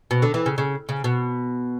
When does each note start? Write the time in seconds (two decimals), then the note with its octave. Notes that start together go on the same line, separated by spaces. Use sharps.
0.11 B2
0.22 D3
0.34 E3
0.46 C#3
0.58 C#3
0.89 C#3
1.04 B2